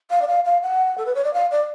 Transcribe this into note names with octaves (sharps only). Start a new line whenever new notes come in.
F5
D5
F5
F5
F#5
A4
B4
C#5
D5
F5
D5